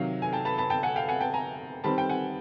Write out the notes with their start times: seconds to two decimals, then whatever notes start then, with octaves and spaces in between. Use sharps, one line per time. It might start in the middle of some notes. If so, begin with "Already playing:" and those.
Already playing: C3 D#3 F#3 F5
0.22 G#5
0.33 G5 A5
0.45 A5 B5
0.58 A5 B5
0.70 G5 A5
0.83 F#5 G#5
0.96 F5 G5
1.08 F#5 G#5
1.21 G5 A5
1.34 G#5 A#5
1.84 D#3 G3 C4 A5 B5
1.98 G5
2.09 F#5 G#5